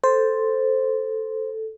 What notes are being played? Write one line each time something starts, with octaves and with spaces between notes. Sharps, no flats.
A4 C5